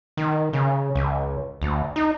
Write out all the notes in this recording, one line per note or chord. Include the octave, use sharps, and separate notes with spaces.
D#3
C#3
C#2
D2
D#4